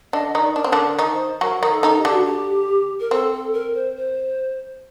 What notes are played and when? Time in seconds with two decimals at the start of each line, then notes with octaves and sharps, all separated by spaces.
0.13 D3 D4 D#5
0.35 D#3 D#4 D5
0.56 D4 A#4
0.64 C4
0.72 D3 D4
0.84 A#4
0.98 D#3 D#4
1.13 C5
1.41 F#3 F#4 A#4
1.63 D#3 D#4
1.70 A4
1.83 D#3 D#4
1.98 G4
2.05 D3 D4
2.12 F#4
2.24 G4
3.00 A#4
3.11 C4 A4
3.33 A4
3.53 A#4
3.75 C5
3.97 C5